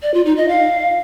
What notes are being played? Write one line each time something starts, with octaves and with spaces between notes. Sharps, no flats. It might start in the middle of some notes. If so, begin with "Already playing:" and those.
D5
F4
D#4
D#5
F5